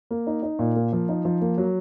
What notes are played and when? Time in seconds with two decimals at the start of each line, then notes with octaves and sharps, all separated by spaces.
0.11 A#3
0.27 D#4
0.43 D#4
0.59 A#2
0.76 A#3
0.93 F3
1.09 D#4
1.25 F3
1.41 A#3
1.58 F#3